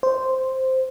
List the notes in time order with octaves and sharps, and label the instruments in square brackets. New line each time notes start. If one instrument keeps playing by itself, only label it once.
[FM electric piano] C5